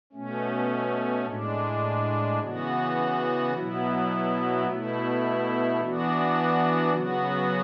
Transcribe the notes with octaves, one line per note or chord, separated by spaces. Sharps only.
B2 A3 C#4
A2 G#3 D4
C#3 E3 B3 F#4
B2 F#3 B3 E4
B2 A3 E4
E3 B3 D4 F#4
C#3 F#3 B3 F#4